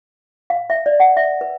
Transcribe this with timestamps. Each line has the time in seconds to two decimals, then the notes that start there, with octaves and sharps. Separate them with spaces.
0.50 F5
0.70 E5
0.86 D5
1.00 F#5
1.17 E5
1.41 B4